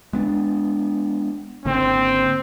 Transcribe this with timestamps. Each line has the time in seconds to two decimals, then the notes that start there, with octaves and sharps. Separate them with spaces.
0.13 G#3 B3 D4
1.65 G#1 D3 A#3 C4